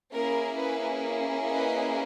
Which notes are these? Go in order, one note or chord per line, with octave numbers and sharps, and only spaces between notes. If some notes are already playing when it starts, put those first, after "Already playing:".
A#3 C#4 E4 G#4 A#4
B4
B4 D#5